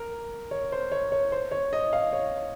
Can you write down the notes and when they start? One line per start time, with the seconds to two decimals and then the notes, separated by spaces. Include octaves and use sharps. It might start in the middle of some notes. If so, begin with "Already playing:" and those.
Already playing: A#4
0.51 C#5
0.72 C5
0.92 C#5
1.12 C#5
1.32 C5
1.51 C#5
1.73 D#5
1.93 F5
2.13 C#5